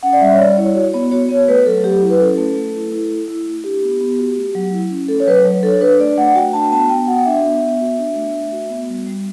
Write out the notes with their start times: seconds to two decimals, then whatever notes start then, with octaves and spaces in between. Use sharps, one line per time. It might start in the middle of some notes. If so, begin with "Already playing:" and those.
0.03 C#4 F#5
0.13 D5
0.21 G3 E5
0.33 C#5
0.39 G3 D5
0.58 E4 C#5
0.75 F#4 C#5
0.93 B3 C#5
1.11 F#4 C#5
1.29 B3
1.48 A3 B4
1.66 F#3 A4
1.84 F#3 G4
2.02 E4
2.10 B4
2.20 C#4 A4
2.38 A3
2.56 A3
2.74 E4
2.92 E4
3.11 A3
3.28 E4
3.46 A3
3.64 D4 G4
3.83 B3
4.01 B3
4.19 F#4
4.37 A3
4.55 F#3
4.72 E4
4.91 C#4
5.08 A3 A4
5.20 C#5
5.27 F#3 B4
5.45 F#3 C#5
5.63 D4 A4
5.81 D4 B4
5.99 A3 D5
6.18 A3 F#5
6.35 F#4 G5
6.53 D4 A5
6.71 B3 A5
6.89 B3 G5
7.07 F#4 F#5
7.25 D4 E5
7.45 B3
7.62 B3
7.81 F#4
7.98 D4
8.16 A3
8.34 A3
8.52 F#4
8.70 B3
8.89 G3
9.07 G3